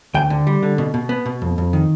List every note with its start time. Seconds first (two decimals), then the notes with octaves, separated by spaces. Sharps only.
0.14 D2 G5
0.30 D3
0.47 G3
0.63 D3
0.78 B2
0.94 B2
1.09 B3
1.26 B2
1.42 F2
1.58 F2
1.73 D#3